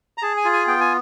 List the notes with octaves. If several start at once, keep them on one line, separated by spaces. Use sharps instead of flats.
A#5
G#4 A5
G#5
F4
G#5
B3 G5
G#5